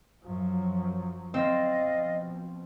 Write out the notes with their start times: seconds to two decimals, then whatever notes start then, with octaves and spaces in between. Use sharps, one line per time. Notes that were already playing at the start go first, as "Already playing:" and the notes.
0.23 F#2 F3 F#3
1.34 C4 D5 D#5 F5
1.81 B2 F3